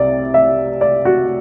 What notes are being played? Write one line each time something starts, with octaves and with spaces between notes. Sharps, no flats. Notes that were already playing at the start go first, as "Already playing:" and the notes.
Already playing: C2 C3 D5
E5
D5
F#4